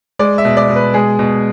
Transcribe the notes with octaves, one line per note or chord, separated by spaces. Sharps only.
G#3 D5
E5
B2
D5
B2
B4
G#3 G#4
B2